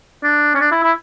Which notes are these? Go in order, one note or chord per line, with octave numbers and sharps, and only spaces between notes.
D4
C#4
D4
E4
E4